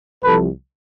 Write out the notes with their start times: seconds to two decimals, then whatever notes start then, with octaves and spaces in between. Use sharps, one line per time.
0.23 C2 C3 F3 A4 B4